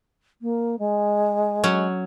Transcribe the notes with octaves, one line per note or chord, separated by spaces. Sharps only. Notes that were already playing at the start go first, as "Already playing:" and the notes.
A#3
G#3
F#3 C#4